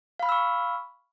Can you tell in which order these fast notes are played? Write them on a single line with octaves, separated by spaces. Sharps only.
F5 B5 F6 E6 C#6